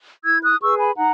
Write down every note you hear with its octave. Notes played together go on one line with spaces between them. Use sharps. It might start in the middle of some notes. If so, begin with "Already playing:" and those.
E4 E6 G#6
D#6 F#6
G#4 B4 C#6 E6
G#5 B5
D#4 F#5 A#5